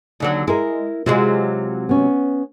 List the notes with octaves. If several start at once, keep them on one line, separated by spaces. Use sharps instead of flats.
D#2 D3 F#3
G#3 E4 A#4
C3 F#3 G#3 F4
B3 C#4